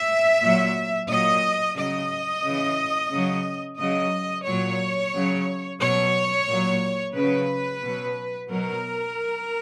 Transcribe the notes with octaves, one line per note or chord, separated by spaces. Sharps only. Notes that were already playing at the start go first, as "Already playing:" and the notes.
Already playing: E5
A#2 F#3
A#2 F#3 D#5
C#3 F#3 D#5
C#3 E3
C#3 F#3
C#3 F#3 D#5
A#2 F#3 C#5
C#3 F#3
B2 F#3 C#5
A#2 F#3
C#3 F#3 B4
B2 F#3
B2 F#3 A#4